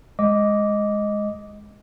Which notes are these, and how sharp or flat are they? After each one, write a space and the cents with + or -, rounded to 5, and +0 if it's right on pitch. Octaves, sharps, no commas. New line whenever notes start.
G#3 +0 D#5 +0 D6 -10